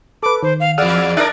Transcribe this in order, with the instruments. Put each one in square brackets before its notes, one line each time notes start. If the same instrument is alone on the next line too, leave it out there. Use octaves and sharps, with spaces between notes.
[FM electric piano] A4 B4 [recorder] D6
[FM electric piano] D#3 [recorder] C5
[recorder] F5
[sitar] E2 G#4 [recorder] D5 [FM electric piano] F#5 E6 F6
[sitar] D4 G#4 A#4 [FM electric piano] E5 F#6 A6